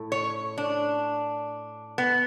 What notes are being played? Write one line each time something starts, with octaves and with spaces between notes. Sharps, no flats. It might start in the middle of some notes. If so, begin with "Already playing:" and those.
Already playing: A2
C#5
D4
B3